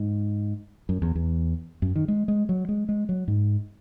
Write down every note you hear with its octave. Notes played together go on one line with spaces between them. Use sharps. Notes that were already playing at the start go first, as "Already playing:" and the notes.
Already playing: G#2
F#2
E2
E2
F#2
D#3
G#3
G#3
F#3
G#3
G#3
F#3
G#2